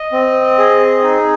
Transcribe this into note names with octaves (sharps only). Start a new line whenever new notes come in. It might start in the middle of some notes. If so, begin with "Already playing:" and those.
Already playing: D#5
C4
G#4
D#4